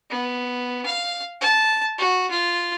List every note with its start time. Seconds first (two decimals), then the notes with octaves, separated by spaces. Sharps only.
0.10 B3
0.86 F5
1.41 A5
1.98 F#4
2.30 F4